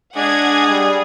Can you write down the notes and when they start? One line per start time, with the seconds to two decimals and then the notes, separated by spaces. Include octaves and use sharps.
0.16 G#3 D4 G#4 F#5 G#6
0.69 G3